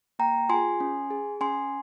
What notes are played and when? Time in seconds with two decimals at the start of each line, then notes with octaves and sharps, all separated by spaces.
0.19 A#3 G5 A#5
0.49 F4 G#4 G#5 C6
0.80 C#4
1.10 G#4
1.41 C#4 G#5 C6